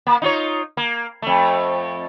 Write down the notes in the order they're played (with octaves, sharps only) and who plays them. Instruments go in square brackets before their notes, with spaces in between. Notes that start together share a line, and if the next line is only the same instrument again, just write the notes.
[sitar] A#3
D#4 F4 C#5
A#3
F2 A3